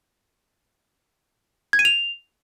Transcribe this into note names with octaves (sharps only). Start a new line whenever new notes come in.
G#6
D#7
F7